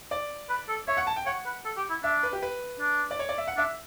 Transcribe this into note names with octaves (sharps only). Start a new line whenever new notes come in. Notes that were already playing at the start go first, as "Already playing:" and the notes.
D5
B4
A4
C#5 E5
F#5
A5
G5
C#5 F#5
B4
A4
G4
E4
D4 E5
B4
G4
B4
D4
D5
C#5
D5
E5
F#5
D4 E5